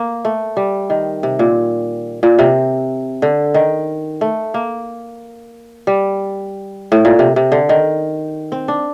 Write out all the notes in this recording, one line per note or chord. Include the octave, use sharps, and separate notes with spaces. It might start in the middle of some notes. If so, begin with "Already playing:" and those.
Already playing: A#3
A3
G3
D#3
C3
A#2
A#2
C3
D3
D#3
A3
A#3
G3
A2
A#2
C3
C3
D3
D#3
C4
D4